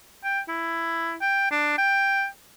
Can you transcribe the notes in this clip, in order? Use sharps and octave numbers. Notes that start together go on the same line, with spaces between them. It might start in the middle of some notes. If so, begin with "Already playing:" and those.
G5
E4
G5
D4
G5